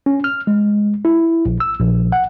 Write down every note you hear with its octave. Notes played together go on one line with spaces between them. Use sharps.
C#4
F6
G#3
E4
A#1
E6
A#1
F#5